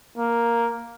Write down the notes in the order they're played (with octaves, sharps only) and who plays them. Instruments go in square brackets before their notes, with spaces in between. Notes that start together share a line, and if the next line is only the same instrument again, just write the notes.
[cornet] A#3